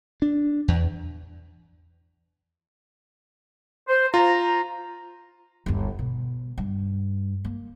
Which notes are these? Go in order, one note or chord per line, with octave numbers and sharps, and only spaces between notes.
D4
E2
C5
F4 A#5
G1 D#2
B2
G2
A#3